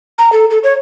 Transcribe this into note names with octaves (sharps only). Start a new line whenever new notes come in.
A#5
A4
A4
C#5